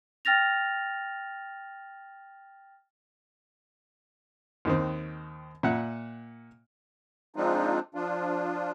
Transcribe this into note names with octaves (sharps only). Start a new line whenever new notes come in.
G5 F6 A6 A#6 F7
D#2 D#3 C4
A#2 E5 F#5
F3 G#3 C4 D4 D#4 F4
F3 D4 F4